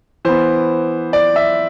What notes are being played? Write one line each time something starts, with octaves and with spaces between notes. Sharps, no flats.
E3 B3 C5
D5
E5